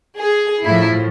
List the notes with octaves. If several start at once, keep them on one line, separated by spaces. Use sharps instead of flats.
G#4
A2 F3 E4